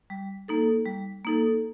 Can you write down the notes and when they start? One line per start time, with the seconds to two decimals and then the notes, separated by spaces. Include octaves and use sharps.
0.10 G3
0.48 A#3 D#4 A4
0.85 G3
1.25 A#3 D#4 A4